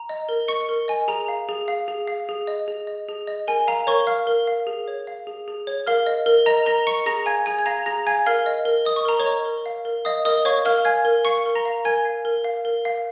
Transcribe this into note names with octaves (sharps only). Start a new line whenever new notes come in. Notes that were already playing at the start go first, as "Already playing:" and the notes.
Already playing: A#5
D#5
A#4
D#5 C#6 C#7
A#4
D#5 G#5
G#4 A#5
F5
G#4
F5
G#4
F5
G#4
D#5
G#4
D#5
G#4
D#5
A#4 G#5
F5 A#5
A#4 C#5 C#6
F5 F6
A#4
F5
G#4
C#5
F5
G#4
G#4
C#5
A#4 F5 F6
D#5
A#4
D#5 A#5 A#6
A#4 A#5 A#6
D#5 C#6 C#7
G#4 A#5 A#6
F5 G#5 G#6
G#4 G#5 G#6
G#6
F5 A#5 A#6
G#4 A#5 A#6
F5 G#5 G#6
A#4 F5 F6
D#5
A#4
D#5 D#6
C#6
A#4 A#5
C#5 C#6
D#5
A#4
F5
A#4
D#5 F5 D#6
A#4 D#5 D#6
C#5 F5 C#6
A#4 F5 F6
F5 G#5 G#6
A#4
F5 C#6 C#7
A#4
A#5 A#6
F5
A#4 G#5 G#6
F5
A#4
F5
A#4
F5